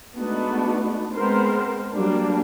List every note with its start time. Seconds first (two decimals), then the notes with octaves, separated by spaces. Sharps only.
0.17 G#3 A3 B3 D4 D#4 F#4
1.14 G#3 B3 C4 A#4 C5
1.93 F#3 G3 A#3 D4